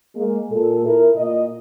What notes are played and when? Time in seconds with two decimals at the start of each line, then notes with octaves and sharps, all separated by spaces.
0.16 G#3 A#3
0.51 A#2 A4
0.86 E4 A#4
1.16 A#2 D#5